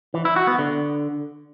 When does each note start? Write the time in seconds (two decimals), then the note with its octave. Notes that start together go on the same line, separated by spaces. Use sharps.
0.14 E3
0.25 E4
0.36 F#4
0.47 B3
0.59 D3